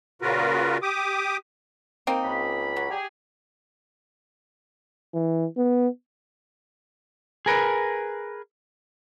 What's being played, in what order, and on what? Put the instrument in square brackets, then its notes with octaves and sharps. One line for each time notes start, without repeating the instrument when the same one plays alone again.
[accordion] A#2 C#3 F4 F#4 A#4 B4
G4 D6 D#6
[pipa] A#3 C4 D#4
[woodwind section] C#2 B5
[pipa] F#3
[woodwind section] G4 G#4
[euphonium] E3
B3
[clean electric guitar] G#4 A#4 B4